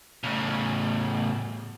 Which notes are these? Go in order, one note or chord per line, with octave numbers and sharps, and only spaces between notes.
A2 C#3